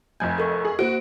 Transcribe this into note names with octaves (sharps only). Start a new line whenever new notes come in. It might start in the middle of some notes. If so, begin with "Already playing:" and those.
F1 F2 G#5 G6 G#6
A4 A#4 C#6
G#4
A#3 F#4 C5 D7